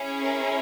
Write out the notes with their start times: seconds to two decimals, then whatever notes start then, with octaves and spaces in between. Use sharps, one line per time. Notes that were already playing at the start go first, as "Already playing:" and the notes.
Already playing: C#4 E4 G#4
0.21 A#4